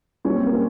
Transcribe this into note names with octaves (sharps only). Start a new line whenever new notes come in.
A#2 G3 C#4
C4
A#3